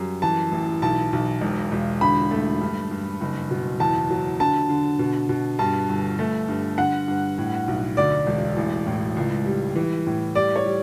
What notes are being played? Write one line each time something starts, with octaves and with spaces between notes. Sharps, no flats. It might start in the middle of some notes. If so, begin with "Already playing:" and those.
Already playing: F#2 G3
E3 A5
A1
B1 A5
B1
E1
E1
D3 B5
A3
G2
G2
F#1
B2
E2 A5
F#3
D3 A5
D3
B2
B2
G2 A5
G1
A3
G2
D3 F#5
G2
A2
B1
D2 D5
E1
A1
A2
C#2
G3
E3
A2
G3 D5
C#5
G3